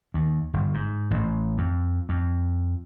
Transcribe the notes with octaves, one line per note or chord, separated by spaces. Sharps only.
D#2
G1
G#2
A1
F2
F2